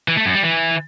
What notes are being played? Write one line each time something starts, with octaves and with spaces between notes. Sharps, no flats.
E3
A3
F#2
G3
E3